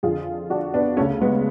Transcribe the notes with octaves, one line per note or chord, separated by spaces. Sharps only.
F2 D3 F4 G#4
D4 F#4
B3 D4
D2 C#3 A3 C#4
G#3 B3